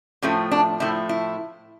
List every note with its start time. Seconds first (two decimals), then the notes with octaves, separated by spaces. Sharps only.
0.22 A2 F3 A3 C#4
0.51 D4
0.80 A2 F3 A3 E4
1.09 E4